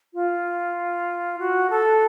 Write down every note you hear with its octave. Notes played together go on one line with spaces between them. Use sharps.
F4
F#4
A4